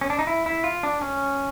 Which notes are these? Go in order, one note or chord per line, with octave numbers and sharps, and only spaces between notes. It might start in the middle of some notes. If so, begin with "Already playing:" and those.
C#4
D4
D#4
E4
E4
F4
D4
C#4